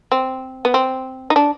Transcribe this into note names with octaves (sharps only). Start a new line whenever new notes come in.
C4
B3
C4
D#4
D4